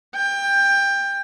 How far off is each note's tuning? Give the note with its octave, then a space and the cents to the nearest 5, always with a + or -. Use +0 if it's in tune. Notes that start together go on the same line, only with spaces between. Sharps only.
G5 +20